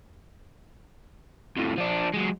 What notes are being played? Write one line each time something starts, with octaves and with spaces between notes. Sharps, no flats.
F2 A2
F3 D4
F#3 G#3